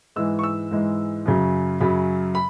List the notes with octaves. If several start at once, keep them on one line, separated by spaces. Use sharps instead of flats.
G#2 E3 G#3 E6
C#6
E6
G#2 E3 G#3
F#2 C#3 F#3
F#2 C#3 F#3 B5
B5